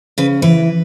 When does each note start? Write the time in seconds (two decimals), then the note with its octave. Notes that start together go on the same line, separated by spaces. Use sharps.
0.18 C#3 B4
0.42 E3 B4